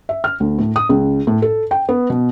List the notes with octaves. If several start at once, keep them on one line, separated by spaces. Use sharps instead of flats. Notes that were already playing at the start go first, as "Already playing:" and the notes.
E5
F6
D2
A2
D#6
C#2
A2
A4
G5
B3
B2